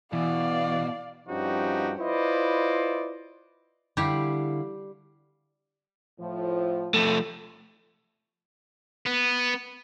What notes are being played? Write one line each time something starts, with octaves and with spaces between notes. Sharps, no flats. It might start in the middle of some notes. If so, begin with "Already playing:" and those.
B2 E3 D5 F5
G2 F3 C#4 D#4 F#4 G4
E4 F4 B4 C5 D5 D#5
D3 G3 E4 G4 F5
A2 F3
F3 A3
B3